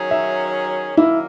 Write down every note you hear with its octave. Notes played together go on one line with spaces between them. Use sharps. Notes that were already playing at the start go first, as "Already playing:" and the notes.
Already playing: D#3 F#3 C#4 G#4
E5
F#2 D#3 F#3 A#3 E4